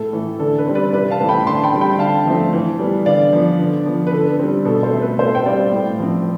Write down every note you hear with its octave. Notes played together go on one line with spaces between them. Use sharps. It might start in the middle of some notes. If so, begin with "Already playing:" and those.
Already playing: A2 A4
E3 A3
D3 A4
B4
G3 C4
B4 D5
C3 B4 D5
F5 A5
E3 A3 C4
G5 B5
D3 A5 C6
G5 B5
G3 C4
G5 B5
D3 F5 A5
F3 A3 C4
E3
G3 B3
D3 D5 F5
F3 B3
D3
F3 B3
B4
D3 A4
G3 C4
B2 A4
A4 C5
A3 C4
B4
B2 A4 C5
G5
G3 C4 D5 F5
A2
F3 C4